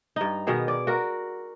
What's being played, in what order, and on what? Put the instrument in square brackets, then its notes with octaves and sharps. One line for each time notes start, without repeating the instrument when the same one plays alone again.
[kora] G2 D#4
B2 D#3 B3 G#4
D5
F#4 A#4